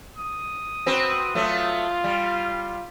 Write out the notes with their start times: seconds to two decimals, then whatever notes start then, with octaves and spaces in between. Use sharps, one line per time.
0.17 D#6
0.86 C4 F#4 B4
1.35 F#3 A3 F4
2.04 G3